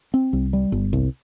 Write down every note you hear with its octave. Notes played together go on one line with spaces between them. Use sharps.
C4
C2
G3
G1
C2